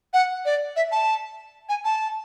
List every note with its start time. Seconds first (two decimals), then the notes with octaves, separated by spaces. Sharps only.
0.13 F#5
0.45 D5
0.76 E5
0.91 A5
1.69 G#5
1.84 A5